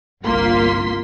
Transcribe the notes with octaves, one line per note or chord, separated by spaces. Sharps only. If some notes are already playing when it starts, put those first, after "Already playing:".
G1 C2 A#3 F4 C6 B6